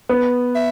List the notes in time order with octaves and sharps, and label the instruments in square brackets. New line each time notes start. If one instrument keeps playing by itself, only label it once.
[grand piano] B3
[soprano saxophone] E5